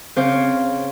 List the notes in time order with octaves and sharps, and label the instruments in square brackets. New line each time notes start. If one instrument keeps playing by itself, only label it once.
[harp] C#3 C4 C5 C#5 F5 D6